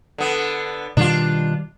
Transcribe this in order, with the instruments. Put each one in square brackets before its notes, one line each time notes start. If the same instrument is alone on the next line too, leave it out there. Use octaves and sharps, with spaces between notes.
[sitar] D3 B3
[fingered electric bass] B2 D#3 G3 [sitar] D4 F4